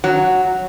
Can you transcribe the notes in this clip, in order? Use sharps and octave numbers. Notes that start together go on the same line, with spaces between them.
F#3